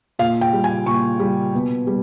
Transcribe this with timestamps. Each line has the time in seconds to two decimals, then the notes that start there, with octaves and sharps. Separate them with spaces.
0.19 A#2 F5
0.41 G5
0.53 G3
0.64 G#5
0.86 A#2 C#6
1.20 G3
1.54 B2
1.87 G3